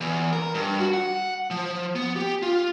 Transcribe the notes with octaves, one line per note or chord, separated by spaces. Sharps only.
E2
A#4
G2
F#4
F#5
F3
B3
G4
F4